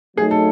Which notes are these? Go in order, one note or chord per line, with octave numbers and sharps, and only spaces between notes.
F#3 A3 D#4 G#4
A4